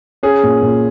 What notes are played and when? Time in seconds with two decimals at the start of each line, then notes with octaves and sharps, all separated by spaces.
0.23 C#4 G#4
0.43 A#2
0.62 A#2